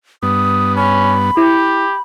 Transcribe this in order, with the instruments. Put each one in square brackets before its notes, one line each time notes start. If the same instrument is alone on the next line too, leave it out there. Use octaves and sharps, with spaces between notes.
[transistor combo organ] G2 B3 [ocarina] D#6
[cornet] C#4 [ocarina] B5
[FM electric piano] E4 [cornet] G4